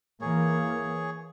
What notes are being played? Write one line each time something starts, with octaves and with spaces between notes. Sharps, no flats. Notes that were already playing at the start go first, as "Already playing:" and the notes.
E3 A#3 G#4 C#5